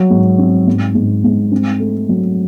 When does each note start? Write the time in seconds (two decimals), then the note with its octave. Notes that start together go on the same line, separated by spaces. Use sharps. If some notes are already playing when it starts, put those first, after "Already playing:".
Already playing: F#3
0.10 G#2
0.38 C4
0.67 G#2
0.95 G#2
1.24 G#2
1.52 C4
1.80 A3
2.09 F#3